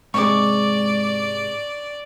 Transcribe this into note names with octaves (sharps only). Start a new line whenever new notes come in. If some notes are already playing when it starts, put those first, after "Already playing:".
G#2 C3 G#3 D5 C#6 D6